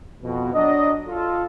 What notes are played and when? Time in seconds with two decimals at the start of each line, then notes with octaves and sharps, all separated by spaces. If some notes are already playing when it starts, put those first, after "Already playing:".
0.23 F2 B2
0.54 F#3 D4 D#5
1.08 F4 A4